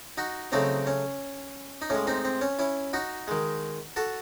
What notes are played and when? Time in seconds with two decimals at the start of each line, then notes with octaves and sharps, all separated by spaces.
0.18 D#4 F#4
0.52 C#3 F#3 A3 C4 D#4
0.87 C#4
1.82 D#4
1.90 A2 G#3 C#4
2.07 C4 D#4
2.25 C4
2.41 C#4
2.59 C#4 E4
2.93 D#4 F#4
3.28 D#3 G#3
3.96 F#4 A4